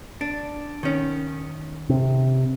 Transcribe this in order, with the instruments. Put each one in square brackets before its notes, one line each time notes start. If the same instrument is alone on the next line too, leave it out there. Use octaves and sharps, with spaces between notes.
[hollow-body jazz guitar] D4
D#3 C#4
[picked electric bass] C3